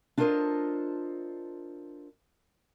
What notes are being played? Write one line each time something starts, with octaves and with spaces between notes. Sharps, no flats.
D4 F4 A4 A#4 C5 D#5